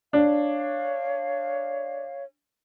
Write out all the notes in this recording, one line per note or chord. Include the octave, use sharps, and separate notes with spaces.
D4 C#5 F5